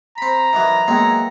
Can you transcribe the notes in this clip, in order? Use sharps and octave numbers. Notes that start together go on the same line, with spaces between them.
C4 A#5 B5
D#3 E3 F#3
F#3 G#3 A#3 B3 G5